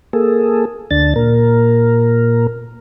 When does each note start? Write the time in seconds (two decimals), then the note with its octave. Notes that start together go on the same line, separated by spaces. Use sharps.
0.13 A#3 G#4 A4
0.91 D2 D4 A6
1.16 A#2 A#4